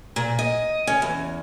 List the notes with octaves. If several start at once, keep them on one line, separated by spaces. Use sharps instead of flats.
A#2
D#5
C#4
E2